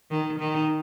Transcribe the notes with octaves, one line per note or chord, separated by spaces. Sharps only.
D#3
D#3